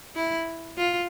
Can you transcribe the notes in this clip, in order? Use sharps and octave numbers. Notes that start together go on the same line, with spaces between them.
E4
F4